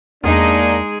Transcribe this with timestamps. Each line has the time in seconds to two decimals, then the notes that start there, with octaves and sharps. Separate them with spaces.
0.24 E2 G#3 A#3 D4 D#4 G#4